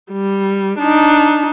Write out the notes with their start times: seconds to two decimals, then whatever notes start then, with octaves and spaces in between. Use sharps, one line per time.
0.12 G3
0.79 D4 D#4